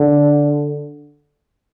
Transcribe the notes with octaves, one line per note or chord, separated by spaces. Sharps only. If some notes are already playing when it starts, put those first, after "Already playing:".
Already playing: D3